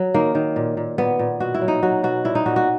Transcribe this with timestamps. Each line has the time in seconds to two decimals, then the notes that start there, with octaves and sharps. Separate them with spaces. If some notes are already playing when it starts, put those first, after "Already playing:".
Already playing: F#3
0.14 D#3 A#3
0.35 D#3
0.56 A#2
0.77 A#2
0.98 A#2 B3
1.19 A#2
1.40 B2 F#4
1.54 E4
1.62 F#3
1.68 D#4
1.83 F#3 F#4
2.03 B2 F#4
2.25 A#2 E4
2.35 D#4
2.46 A#2 F#4
2.56 F#4